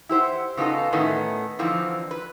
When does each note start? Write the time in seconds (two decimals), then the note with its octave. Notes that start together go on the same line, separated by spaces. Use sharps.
0.09 E4 G4 C5 F#5
0.57 C#3 B3 D#4 F4 A4
0.92 A2 D#3 A3 B3 C#4
1.59 D3 E3 F3 C4 D#4
2.11 B4